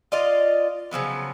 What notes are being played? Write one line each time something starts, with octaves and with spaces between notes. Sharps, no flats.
F4 D5 D#5 F5
C#3 F3 F#3 B3